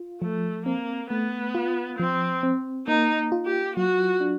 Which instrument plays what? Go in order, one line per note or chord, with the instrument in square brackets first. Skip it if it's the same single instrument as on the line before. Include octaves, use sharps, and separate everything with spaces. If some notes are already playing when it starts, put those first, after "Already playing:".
Already playing: [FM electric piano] F4
[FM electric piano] F3 [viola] A3
[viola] A#3 [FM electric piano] C4
[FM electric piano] A3 [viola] B3
[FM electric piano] F4
[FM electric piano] F3 [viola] C4
[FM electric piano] C4
[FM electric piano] A#3 [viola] D#4
[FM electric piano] F4
[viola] G4
[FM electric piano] F#3 [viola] F#4
[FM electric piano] D4